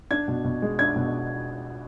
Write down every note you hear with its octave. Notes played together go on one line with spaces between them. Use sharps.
D4 G#6
B2
B2
G#3
D4 G#6
B2